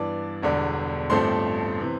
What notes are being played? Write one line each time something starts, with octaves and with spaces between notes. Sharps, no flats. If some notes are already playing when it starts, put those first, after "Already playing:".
Already playing: G2 E3 B3 D4 D5 D6
E1 E2 D3 G3
A1 G2 F3 A3 C4 C5 C6
C3 E3